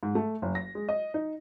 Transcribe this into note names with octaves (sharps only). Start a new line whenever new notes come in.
G#2
A3
F#1
A#6
G#3
D#5
D#4